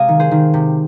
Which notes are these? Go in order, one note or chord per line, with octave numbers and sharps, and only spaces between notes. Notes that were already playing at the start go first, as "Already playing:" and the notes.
Already playing: C3 G#3 D#5 F5 G#5
D#3
G#4 C5
D#3
C3